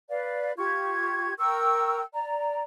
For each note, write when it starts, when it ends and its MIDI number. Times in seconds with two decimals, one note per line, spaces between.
0.10 0.52 71
0.10 0.52 74
0.10 0.52 77
0.57 1.33 65
0.57 1.33 67
0.57 1.33 85
0.57 1.33 92
1.38 2.02 70
1.38 2.02 79
1.38 2.02 85
1.38 2.02 88
2.13 2.63 74
2.13 2.63 82